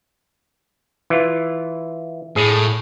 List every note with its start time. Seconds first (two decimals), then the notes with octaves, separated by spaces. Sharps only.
1.10 E3 F4
2.36 A2 G#4